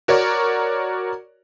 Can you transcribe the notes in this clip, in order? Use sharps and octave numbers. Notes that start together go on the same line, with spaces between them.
F#4 A#4 C#5 D5